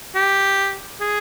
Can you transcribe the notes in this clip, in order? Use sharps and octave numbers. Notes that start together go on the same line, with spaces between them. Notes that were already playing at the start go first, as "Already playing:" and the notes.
G4
G#4